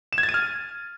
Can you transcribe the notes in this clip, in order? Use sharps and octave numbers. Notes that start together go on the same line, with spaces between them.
E7
G#6
A6
D#7
F6